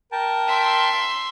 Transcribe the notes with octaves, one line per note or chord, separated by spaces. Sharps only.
A#4 G5 A5
E5 C6